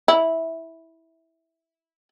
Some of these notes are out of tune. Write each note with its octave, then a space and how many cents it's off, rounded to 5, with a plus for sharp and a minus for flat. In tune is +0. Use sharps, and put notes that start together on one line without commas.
E4 -10